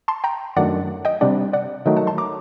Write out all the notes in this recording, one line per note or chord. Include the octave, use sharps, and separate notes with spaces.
A5 C6
G5 A#5
F#2 D#3 F#3 A3 D4 D5 F#5
D#5 G5
C3 G3 D4 D5 F#5
D5 F#5
D#3 F#3 A3 D#4 D#5 G5
F#5 A5
A5 C6
A#5 D6